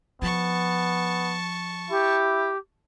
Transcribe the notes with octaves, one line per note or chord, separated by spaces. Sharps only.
F3 B3 A5 C#6
E4 G4